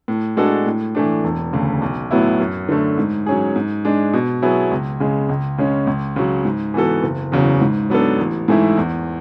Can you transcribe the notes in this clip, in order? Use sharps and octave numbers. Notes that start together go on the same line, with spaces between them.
A2
G#3 D4 F#4 A4
A2
E3 A3 D4
E1
D2 C#3
B1
A2 F#3 B3 E4
F#2
D3 A3
G#2
F#3 C#4 G#4
G#2
G#3 D4
B2
F#3 B3 E4 G#4
C#2
C#3 G#3
C#2
C#3 G#3 C#4
C#2
C#3 F#3
G#2
E3 B3 F#4 A4
F#1
E2 C#3 F#3
G#2
F#3 B3 D4 A4
A1
G#2 E3 A3 E4
E2